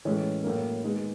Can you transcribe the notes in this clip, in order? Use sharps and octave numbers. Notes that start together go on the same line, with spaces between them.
A2 E3 G#3 C#4
A2 F#3 A#3
D#3 G#3 B3